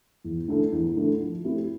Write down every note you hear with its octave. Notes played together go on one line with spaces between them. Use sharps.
E2
D3 A3 E4 A4
E2
D3 A3 E4 A4
F3
A3 C4 E4 G4